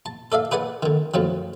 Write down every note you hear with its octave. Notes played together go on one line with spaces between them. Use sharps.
A5
A4 D5 E5 F5
G#4 B4 D5 F#5 G#5
D3 D#3
F#2 A2 F3 F#3